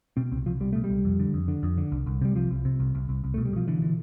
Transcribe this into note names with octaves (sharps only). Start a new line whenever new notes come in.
B2 C4
C2 C4
C2 F3
C2 G3
B2 A3
G3
C2
F2
D3
F2
D3
F2
D3
C2
C2
C3 G3
C2 F3
C2
C3
C2
C2
C2
C2
B2 A3
G3
B2 F3
D3 E3
D3